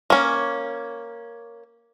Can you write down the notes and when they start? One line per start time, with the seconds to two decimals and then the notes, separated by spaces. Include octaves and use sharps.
0.10 A#3 C#4